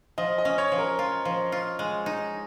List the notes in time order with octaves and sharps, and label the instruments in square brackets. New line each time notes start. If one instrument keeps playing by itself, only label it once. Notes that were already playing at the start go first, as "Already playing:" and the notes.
[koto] F3 [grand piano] D#5
[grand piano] D#5
[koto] C#4
[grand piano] C#5
[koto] F3
[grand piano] A#4
[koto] F4
F3
F4
G#3
D#4